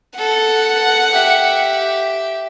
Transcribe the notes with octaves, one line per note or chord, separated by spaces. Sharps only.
A4 F#5
G4 E5